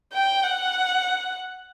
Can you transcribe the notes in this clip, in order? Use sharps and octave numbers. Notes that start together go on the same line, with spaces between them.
G5
F#5